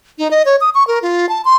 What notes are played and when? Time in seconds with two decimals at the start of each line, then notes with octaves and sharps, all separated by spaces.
0.18 D#4
0.31 D#5
0.45 C#5
0.61 D#6
0.75 C#6
0.87 A#4
1.02 F4
1.29 A5
1.45 C6